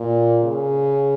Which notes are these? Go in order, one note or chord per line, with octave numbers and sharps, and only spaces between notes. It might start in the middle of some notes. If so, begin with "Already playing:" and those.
Already playing: A#2
C#3